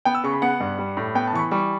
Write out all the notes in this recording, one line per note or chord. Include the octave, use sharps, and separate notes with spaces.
B3 G5
E6
C#3 C#6
B5
B3 F#5
G2
G3
A2
B3 G5
A5
E3 C#6
B5
G3 C#6